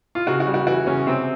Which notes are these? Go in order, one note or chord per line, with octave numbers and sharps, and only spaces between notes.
F4
C#3 F#4
F#4
G3
F#4
E3 F#4
C#3 C#4
C3 C4